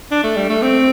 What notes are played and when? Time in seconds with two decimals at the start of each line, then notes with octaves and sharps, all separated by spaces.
0.11 D4
0.24 A3
0.37 G3
0.49 A3
0.62 C4